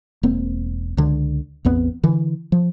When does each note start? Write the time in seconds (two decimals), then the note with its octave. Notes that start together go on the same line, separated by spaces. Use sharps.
0.23 E1 A#3 C4
0.97 C#2 D3
1.65 A1 E2 B3 C4
2.03 D3 E3
2.52 F3